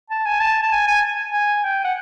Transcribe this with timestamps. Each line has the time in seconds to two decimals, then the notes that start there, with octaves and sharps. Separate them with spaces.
0.10 A5
0.26 G#5
0.40 A5
0.63 A5
0.72 G#5
0.87 G#5
1.33 G#5
1.64 G5
1.84 F#5